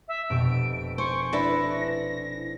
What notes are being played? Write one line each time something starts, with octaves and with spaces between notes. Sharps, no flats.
E5
F1 B2 G4 D7
C5 G#5 C#6 D7
D4 E4 B4 A#6